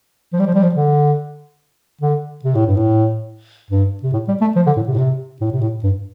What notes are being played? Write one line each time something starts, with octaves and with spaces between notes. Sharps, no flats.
F3
G3
F3
G3
F3
D3
D3
C3
A2
G2
A2
G2
C3
A2
G3
A3
F3
D3
A2
C3
A2
C3
A2
C3
A2
G2